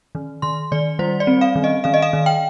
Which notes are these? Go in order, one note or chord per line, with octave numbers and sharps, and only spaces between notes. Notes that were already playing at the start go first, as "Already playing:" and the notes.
D#3
D#3 C6
D#3 D5
G3 C5
D5
C4
F5
D#3
D#5
D#3 F5
D#5
F5
D#3
G5